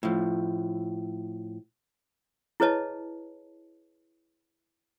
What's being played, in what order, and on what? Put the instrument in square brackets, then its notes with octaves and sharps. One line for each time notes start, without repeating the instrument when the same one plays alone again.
[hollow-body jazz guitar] A2 F3
[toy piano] E4 G#4 B4 C#5 D#5 A5